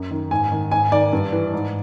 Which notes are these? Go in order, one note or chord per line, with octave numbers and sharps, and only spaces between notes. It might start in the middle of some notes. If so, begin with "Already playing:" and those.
Already playing: F#2
D#3
G#2 G#5
D#3
G#2 G#5
D#3 D5
G2
E3
G#2